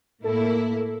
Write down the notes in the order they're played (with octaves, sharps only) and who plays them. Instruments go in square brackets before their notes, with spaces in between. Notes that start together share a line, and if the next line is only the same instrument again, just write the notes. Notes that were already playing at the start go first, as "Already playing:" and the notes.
[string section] A2 A#3 E4 [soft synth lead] A4